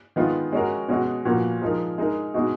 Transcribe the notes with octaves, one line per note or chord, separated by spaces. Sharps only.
D#3 G#3 B3 F4
G#3 C#4 F#4 A#4
B2 G#3 C#4 F#4
A#2 F3 B3 F#4 A#4
F3 G#3 D#4 A#4
G#3 D#4 A#4
B2 G#3 D#4 F#4